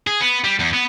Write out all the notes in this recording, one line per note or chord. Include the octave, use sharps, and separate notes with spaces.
G#4
B3
G3
E2
B3